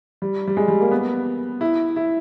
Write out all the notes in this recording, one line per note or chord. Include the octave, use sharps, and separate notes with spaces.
G3
G3
G#3
G3
A#3
B3
E4
E4